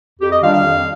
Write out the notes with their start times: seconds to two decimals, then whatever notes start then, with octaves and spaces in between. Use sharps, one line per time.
0.20 F2 G4
0.31 D#5
0.42 D#3 G3 D4 F4 F5
0.53 F5
0.63 F2